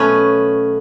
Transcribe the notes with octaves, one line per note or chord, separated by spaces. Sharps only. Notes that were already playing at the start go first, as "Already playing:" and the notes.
Already playing: B2 F#3 A3 B3 C#4